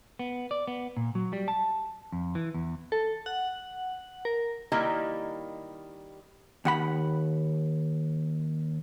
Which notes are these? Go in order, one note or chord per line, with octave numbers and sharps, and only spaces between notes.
B3
D5
B3
A#2
F#3
G3
A5
F2
E3
E2
A4
F#5
A#4
D#3 G3 A#3 E4 G4 D#5
D#2 F#5 B5